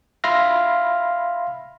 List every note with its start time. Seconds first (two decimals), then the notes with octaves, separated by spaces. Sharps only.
0.24 E5 F5 B5 C6 F6 A#6